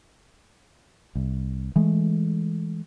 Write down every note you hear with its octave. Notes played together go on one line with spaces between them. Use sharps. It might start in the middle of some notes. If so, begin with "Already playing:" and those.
C2
E3 G#3 A3